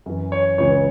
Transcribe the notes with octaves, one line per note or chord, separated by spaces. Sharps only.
F#2 E3
C#5
C#2 C#3 E3 C#5